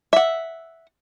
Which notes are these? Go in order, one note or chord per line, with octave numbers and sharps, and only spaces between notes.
E5 F#5